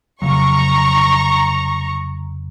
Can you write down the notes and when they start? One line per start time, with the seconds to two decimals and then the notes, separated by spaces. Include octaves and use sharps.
0.22 F1 C#3 F#3 A#5 C#6